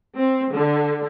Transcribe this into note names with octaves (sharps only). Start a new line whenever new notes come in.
C4
D3